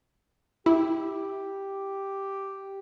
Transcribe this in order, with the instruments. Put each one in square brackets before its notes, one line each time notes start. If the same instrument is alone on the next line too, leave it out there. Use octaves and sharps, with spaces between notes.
[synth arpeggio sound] E4 [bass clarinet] G4